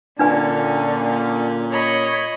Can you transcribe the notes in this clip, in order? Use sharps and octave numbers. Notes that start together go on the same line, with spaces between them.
A#2 D3 C#4 D4 B4 G#5
C#5 D#5 B5